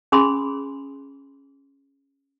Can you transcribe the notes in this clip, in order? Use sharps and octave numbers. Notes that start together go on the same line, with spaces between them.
C#4 G#4 G#5 B5 C6 D#6